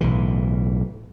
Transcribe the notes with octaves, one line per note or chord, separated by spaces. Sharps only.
B1 A2 E3